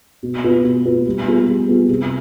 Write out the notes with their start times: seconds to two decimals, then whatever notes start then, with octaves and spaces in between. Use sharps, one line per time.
0.23 B2
0.44 B3 F4 B4
0.64 B2
0.85 B3 F4 B4
1.06 G3
1.27 B3 F4 G#4
1.47 G3
1.68 B3 F4 G#4
1.89 C3